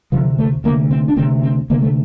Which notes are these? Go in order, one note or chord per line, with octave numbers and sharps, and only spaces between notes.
D2 C3 F3
A3
D2 C3 A#3
C4
D4
D2 C3 C4
C4
D2 C3 A#3
A3